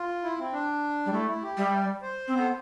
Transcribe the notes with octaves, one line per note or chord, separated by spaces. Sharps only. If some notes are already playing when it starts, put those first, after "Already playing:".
Already playing: F4
E4
C4
D4
G3
A3 E4
E4
G4
G3 E5
D5
C5
C4
B3 A4